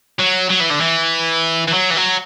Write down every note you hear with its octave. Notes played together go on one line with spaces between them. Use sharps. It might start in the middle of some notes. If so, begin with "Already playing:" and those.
F#3
F#3
E3
D3
E3
E3
F#3
E3
F#3